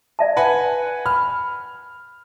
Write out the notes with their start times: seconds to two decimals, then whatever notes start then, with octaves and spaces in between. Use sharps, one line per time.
0.19 D5 E5 A5
0.37 B4 F#5 G#5
1.06 B5 F6